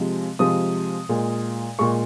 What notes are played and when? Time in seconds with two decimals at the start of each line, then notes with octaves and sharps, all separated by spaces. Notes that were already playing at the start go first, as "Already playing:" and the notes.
Already playing: C3 F3 G#3
0.39 C3 F3 G#3 D#6
1.09 A#2 G#3
1.79 A#2 G#3 C#6